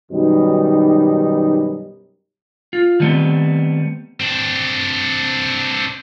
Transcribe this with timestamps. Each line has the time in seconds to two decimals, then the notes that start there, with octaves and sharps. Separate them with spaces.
0.12 F#2 B2 D#3 G3 D#4
2.73 F4
3.00 D#3 G3 A3 B3 C4
4.21 C4 D4